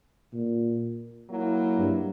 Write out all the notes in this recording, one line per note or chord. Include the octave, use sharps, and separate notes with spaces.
A#2
F#3 A#3 E4
G2